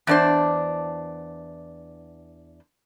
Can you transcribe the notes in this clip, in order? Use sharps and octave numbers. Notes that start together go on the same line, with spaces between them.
E2 D4 C5